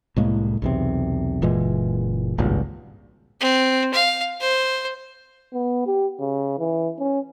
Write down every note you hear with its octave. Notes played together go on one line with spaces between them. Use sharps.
C2 A2 G#3 A#3
B1 E2 C3
F#1 A#2 E3 G#3
G#1 C#2 G2 A#2
C4
F5
C5
B3
G4
C#3
E3
C#4